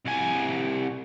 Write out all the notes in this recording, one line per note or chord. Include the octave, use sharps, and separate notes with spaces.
C2 G#5